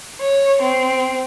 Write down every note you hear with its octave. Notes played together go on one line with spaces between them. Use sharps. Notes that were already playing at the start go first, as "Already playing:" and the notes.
C#5
C4